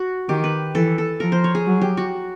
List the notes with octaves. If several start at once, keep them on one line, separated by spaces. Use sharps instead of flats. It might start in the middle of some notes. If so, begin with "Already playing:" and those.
Already playing: F#4
D#3 G4
B4
E3 A4
A4
F3 A#4
C5
C#5
G#4
F#3
G4
F#4